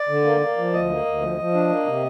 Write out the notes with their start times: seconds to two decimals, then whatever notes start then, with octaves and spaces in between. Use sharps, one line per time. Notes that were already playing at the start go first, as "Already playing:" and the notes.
Already playing: D5
0.09 D3
0.24 A#3
0.40 A#3
0.57 F3
0.73 D2 D#5
0.89 A#3
1.05 D2
1.22 F3
1.38 F3
1.54 D4
1.70 A#3
1.86 C3